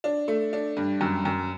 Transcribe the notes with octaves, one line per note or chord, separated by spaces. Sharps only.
D4
A3
D4
G2
F#2
F#2